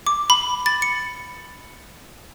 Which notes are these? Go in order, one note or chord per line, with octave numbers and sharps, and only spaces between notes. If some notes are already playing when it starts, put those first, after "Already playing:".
D6
B5
A6
C#7